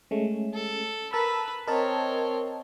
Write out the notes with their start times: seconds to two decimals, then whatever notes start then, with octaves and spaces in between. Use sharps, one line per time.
0.11 G#3 A3 C#4
0.54 A4
1.13 A#4 B4 A5 E6
1.68 C4 A#4 C#5 D#5 A5